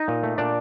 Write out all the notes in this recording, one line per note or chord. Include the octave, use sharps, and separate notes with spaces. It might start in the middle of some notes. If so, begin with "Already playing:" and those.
Already playing: D#4 D#5
A#2
A3
A#2 D4 D5